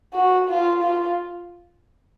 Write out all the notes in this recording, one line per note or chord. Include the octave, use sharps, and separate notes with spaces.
F#4
F4
F4